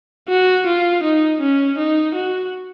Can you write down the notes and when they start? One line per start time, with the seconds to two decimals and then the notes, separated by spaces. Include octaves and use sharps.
0.29 F#4
0.66 F4
1.03 D#4
1.40 C#4
1.78 D#4
2.15 F#4